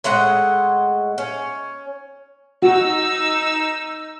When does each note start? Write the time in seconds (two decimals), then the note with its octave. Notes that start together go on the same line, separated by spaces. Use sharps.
0.04 A2 G#3 D#5 F#5
1.18 C#4
2.62 D#4 F#4 E6